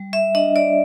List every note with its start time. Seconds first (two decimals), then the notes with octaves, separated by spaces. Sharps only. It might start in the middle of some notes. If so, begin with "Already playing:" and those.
Already playing: G3
0.13 E5
0.35 D4 D#5
0.56 D5